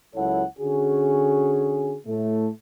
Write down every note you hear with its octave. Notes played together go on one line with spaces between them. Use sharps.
C#2 F#3 E4 A4 C#5 F#5
D3 C#4 F#4 G#4
A2 A3